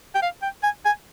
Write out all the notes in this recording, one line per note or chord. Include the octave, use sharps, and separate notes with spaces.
G5
F5
G5
G#5
G#5